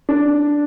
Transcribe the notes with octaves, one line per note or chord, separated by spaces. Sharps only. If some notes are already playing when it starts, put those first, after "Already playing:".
D4